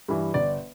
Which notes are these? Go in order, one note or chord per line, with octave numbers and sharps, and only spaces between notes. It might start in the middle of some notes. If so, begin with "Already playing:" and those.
G2 E3
G1 D5